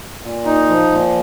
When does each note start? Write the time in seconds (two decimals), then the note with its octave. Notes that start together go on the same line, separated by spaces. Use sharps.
0.23 A#2
0.45 D#4
0.69 F3
0.92 A#2